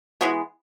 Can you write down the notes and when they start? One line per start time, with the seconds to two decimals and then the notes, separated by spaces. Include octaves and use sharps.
0.21 E3 G#3 B3 F#4